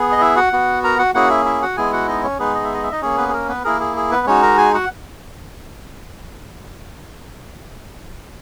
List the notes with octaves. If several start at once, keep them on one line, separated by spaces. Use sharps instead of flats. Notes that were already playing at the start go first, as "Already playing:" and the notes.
Already playing: B3 G#4
D#5
E4 E5
F#4 F#5
B3 F#4
A#4 A#5
F#4 F#5
A#3 C#4 E4 F#4 G#4 F#5
E4 E5
E4 E5
F#4 F#5
G#3 B3 E4 G#4 G#5
F#4 F#5
D#4 D#5
C#4 C#5
G#3 B3 D#4 G#4 B4
D#5
E5
D#5
E5
D#4 D#5
A#3 C#4 G#4 C#5
B3 B4
G#4
A#4
B3 B4
A#3 E4 G#4 A#4
G#4
G#4
B3 B4
G#3 C#4 D#4 F#4 C#5
A#4 A#5
G#4 G#5
F#4 F#5